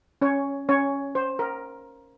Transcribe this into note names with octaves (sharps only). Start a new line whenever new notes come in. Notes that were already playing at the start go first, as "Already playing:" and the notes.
C#4 C#5
C#4 C#5
C5
A#4